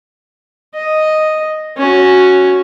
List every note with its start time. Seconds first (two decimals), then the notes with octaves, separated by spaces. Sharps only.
0.75 D#5
1.77 C#4 F#4